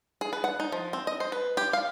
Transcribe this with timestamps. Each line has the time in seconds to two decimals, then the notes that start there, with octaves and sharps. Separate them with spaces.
0.21 G#4
0.33 B4
0.44 F#5
0.60 D#4
0.72 F3
0.93 C4
1.07 D#5
1.20 C5
1.32 B4
1.57 G4
1.73 F5